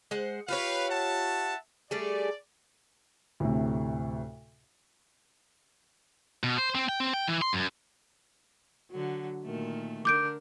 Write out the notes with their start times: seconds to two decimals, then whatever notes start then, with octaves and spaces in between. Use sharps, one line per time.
0.11 G#3 C5 F#5
0.48 F4 G4 B4 C#5 F5
0.89 E5 F#5 A5
1.91 G3 A3 G#4 D5
3.40 D2 A2 C3
6.44 B2
6.58 C5
6.75 C4
6.89 G5
7.00 C4
7.13 G5
7.28 E3
7.42 C6
7.53 F#2
8.91 D3 F#3
9.45 A#2 D#3 A3
10.05 D3 D4 A#4 D6 G6 D7